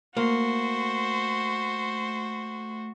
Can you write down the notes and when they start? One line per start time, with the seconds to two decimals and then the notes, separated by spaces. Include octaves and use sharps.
0.17 A3 A#3 F#4 C5